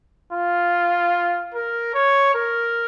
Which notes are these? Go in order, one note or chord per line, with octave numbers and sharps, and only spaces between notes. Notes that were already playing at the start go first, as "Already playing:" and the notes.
F4
A#4
C#5
A#4